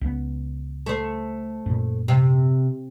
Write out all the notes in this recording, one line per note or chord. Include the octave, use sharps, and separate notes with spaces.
C#2 B3
A3 C5
F#2 A#2
C3